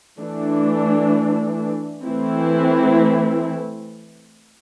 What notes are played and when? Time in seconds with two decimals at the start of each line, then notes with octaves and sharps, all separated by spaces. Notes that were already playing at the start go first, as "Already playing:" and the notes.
0.19 E3 A3 D4
2.04 E3 A3 C4 E4